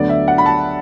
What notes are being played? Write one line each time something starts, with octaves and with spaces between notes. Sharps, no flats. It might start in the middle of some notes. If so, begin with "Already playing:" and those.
Already playing: D2 D3 F#3 B3 D4 D5
E5
F#5
B5
A5